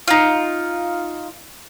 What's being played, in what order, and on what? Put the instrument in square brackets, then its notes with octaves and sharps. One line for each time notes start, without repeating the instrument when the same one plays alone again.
[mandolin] D#4 F4